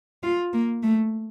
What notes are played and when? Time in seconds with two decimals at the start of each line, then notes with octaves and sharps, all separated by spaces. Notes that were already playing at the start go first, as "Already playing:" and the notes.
0.23 F4
0.53 A#3
0.83 A3